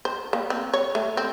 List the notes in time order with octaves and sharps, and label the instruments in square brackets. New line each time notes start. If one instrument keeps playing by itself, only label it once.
[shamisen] C5
A#3
C4
C#5
A3
C4